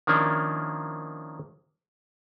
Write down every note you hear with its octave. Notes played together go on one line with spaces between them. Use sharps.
D#3 F3 A#3 C#4 D4 E4